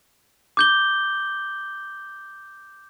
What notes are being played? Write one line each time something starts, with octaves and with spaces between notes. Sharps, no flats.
D6 G6 G7